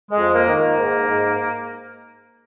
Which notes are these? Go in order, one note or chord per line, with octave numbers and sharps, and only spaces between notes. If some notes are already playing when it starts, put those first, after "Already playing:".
G#3
F2
A#3
D#3
A#3
G#2
G#2